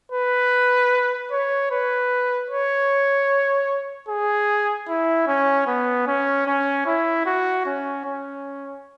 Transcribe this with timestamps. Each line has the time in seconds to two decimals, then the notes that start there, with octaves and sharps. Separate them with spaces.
0.12 B4
1.31 C#5
1.71 B4
2.50 C#5
4.09 G#4
4.88 E4
5.27 C#4
5.67 B3
6.07 C#4
6.47 C#4
6.86 E4
7.26 F#4
7.66 C#4
8.05 C#4